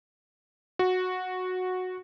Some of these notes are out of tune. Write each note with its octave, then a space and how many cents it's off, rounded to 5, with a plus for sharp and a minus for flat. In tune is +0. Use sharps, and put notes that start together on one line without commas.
F#4 -10